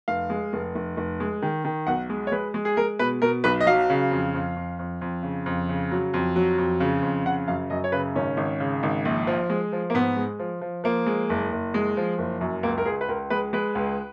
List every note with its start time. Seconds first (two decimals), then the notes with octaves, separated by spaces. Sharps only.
0.08 F1 F5
0.30 G#3
0.53 F1
0.75 F1
0.97 F1
1.20 G#3
1.42 D#3
1.65 D#3
1.87 B1 F#5
2.10 G#3
2.27 C#5
2.32 G#3 B4
2.54 G#3
2.65 G#4
2.77 G#3 A#4
2.99 B2 B4
3.22 B2 A#4
3.44 B1 B4
3.61 D#5
3.66 F#3 F5
3.90 C#3
4.11 F2
4.34 F2
4.56 F2
4.79 F2
5.01 F2
5.23 C#3
5.46 F2
5.69 C#3
5.91 F#3
6.14 F2
6.36 F#3
6.58 F2
6.80 C#3
7.02 F2
7.26 C#3 F#5
7.48 F#2 F5
7.70 F#2 D#5
7.84 C#5
7.92 C#3 B4
8.15 G#1 C#4
8.37 G#1
8.60 C#3
8.83 G#1
9.05 A#1
9.27 F3
9.50 G#3
9.73 F3
9.90 A#3
9.94 G#2 B3
10.17 G#3
10.39 F3
10.61 F3
10.84 F3 A#3
11.07 G#3
11.30 F#1
11.52 F#1
11.74 G#3
11.97 F3
12.18 F#1
12.41 F#2
12.63 C#2 A#3
12.78 A#4
12.86 C#2 G#4
13.01 B4
13.09 C#2 A#4
13.30 G#3 B4
13.53 G#3 B4
13.75 C#2